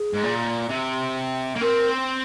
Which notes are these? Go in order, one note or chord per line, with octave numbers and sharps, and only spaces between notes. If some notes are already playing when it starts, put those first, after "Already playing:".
Already playing: G#4
G#2
A#2
C3
A#3
C4 A#4